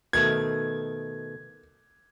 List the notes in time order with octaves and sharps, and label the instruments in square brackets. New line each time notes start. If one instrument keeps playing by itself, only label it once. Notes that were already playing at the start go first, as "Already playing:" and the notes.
[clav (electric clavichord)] B2 D#3 A3 [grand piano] G#6